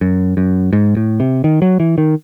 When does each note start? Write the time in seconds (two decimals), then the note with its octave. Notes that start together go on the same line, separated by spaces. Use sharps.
0.01 F#2
0.37 F#2
0.73 G#2
0.97 A2
1.20 C3
1.44 D#3
1.62 F#3
1.80 E3
1.98 D#3